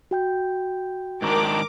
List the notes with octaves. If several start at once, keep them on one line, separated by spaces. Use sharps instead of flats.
F#4 G5 G6
G#2 D#3 D4 A#4 D6